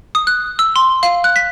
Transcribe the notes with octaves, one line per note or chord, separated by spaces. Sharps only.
D#6
F#6
E6
C6
F5
F#6
B6